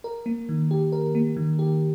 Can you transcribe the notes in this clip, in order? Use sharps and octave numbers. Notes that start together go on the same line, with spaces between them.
A#4
A#3
D#3
G4
A#4
A#3
D#3
G4